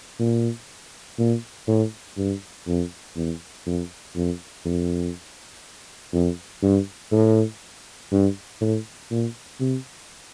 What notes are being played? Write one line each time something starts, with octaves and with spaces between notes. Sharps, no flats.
A#2
A#2
A2
G2
F2
E2
F2
F2
F2
F2
G2
A2
G2
A2
A#2
C3